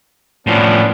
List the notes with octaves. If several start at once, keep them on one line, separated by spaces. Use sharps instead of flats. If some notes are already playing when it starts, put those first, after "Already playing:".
A2 F3 B3 C#4 D4